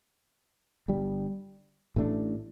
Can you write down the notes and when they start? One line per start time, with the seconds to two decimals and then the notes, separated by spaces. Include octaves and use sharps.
0.88 G1 G2 G3
1.96 A1 A2 A3 D4